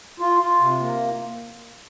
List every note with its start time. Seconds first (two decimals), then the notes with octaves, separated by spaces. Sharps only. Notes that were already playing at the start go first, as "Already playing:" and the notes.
0.20 F4
0.40 F4
0.60 C3
0.80 A#3